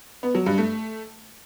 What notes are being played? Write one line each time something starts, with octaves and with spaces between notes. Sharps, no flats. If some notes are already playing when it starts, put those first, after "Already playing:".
B3
F#3
G2
A3